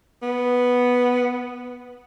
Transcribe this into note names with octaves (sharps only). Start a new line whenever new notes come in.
B3